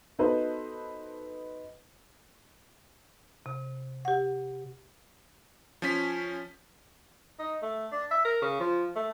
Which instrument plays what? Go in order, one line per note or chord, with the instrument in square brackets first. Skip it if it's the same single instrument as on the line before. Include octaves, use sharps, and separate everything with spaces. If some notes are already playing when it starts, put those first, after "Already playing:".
[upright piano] B3 D#4 F#4 A4 B4 C5
[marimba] C3
G4 F#5
[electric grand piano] F3 C#4 B6
[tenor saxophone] D#4
A3
D4
E5
A#4
C#3
F3
A3